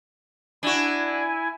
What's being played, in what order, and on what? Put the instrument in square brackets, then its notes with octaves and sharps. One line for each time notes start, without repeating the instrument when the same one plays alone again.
[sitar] D4 F#4 [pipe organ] E4 G#5